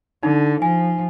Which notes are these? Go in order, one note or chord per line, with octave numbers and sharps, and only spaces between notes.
D3 D#4
F3 G#5